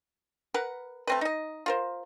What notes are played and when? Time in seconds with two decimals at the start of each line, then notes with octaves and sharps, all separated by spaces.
0.54 A#4 B4 F#5
1.07 A3 C4 B4
1.21 D#4 D#5
1.66 F4 A#4 C5